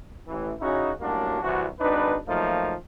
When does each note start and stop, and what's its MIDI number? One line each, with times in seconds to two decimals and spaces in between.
0.28 0.50 33
0.28 0.50 52
0.60 0.90 49
0.60 0.90 61
0.60 0.90 63
0.60 0.90 64
0.60 0.90 66
1.00 1.38 42
1.00 1.38 45
1.00 1.38 55
1.00 1.38 58
1.00 1.38 62
1.00 1.38 66
1.41 1.65 36
1.41 1.65 48
1.41 1.65 52
1.41 1.65 66
1.80 2.15 32
1.80 2.15 62
1.80 2.15 63
1.80 2.15 71
2.27 2.72 53
2.27 2.72 54
2.27 2.72 57
2.27 2.72 58
2.27 2.72 63
2.27 2.72 65